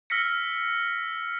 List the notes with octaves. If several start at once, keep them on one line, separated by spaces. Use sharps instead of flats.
E6 F6 A#6 B6 C#7